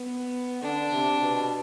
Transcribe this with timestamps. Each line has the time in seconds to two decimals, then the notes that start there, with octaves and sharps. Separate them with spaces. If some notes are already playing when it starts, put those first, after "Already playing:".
Already playing: B3
0.62 D3 D4
0.91 C3
1.20 B2